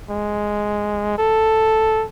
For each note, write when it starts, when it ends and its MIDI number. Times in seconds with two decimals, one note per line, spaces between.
0.10 1.18 56
1.18 2.05 69